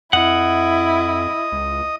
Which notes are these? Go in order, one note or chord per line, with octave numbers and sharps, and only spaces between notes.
F2 E4 D#5 F#5 D#6
C#2